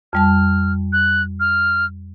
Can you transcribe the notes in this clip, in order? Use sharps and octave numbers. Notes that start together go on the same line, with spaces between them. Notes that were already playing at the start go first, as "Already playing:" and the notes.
F2 G3 A5 F6
F#6
F6